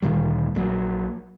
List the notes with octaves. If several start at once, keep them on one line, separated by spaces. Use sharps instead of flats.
D2 A#2 D#3 G3
A#1 A#2 F#3